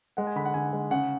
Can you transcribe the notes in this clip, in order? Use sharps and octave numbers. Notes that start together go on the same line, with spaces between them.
G#3 F#5
G#5
D3 B5
F#5
D3 G#5
G#3
C#3 F#5